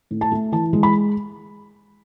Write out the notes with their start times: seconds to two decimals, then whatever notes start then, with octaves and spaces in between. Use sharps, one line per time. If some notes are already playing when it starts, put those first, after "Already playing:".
0.11 A2
0.21 A5
0.32 A3
0.52 E3 A5
0.73 G#3
0.83 B5